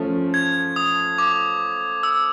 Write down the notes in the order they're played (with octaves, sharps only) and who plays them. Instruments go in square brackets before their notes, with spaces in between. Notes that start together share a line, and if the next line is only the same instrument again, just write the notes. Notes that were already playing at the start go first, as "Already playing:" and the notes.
Already playing: [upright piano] F3 A3 C#4
[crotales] G#6
D#6
D6
E6